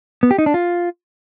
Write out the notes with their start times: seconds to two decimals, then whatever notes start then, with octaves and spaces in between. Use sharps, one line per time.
0.23 B3
0.31 G4
0.38 D#4
0.46 D4
0.54 F4